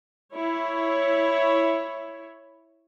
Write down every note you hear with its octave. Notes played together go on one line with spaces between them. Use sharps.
E4 C#5